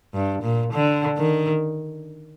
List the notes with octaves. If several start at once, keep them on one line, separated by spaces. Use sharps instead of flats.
G2
A#2
D3
D#3